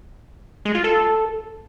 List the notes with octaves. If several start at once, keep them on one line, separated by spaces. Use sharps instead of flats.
G#3
F4
A4